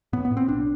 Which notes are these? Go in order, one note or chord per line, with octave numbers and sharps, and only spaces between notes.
A2 B3
B3
A2
C4
B1 D4